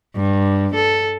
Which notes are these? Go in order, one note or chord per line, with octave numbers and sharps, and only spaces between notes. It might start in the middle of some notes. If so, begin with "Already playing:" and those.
G2
A4